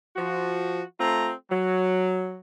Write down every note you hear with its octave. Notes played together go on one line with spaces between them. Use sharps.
F3 F#4
A3 C4 F4 A#5
F#3